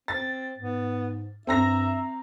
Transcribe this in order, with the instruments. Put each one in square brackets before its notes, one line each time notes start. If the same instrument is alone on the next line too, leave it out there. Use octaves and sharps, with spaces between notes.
[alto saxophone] C4 [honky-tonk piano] A6
[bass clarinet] G#2 [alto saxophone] B3
[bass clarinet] G2 [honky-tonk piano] C4 A#5 A#6 [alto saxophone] E5